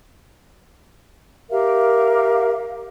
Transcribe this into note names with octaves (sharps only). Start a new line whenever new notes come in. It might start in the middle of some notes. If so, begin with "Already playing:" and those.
G4 A#4 E5 F5